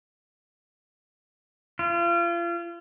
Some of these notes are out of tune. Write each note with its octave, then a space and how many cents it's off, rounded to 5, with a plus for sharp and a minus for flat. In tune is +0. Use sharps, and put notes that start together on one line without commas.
F4 -35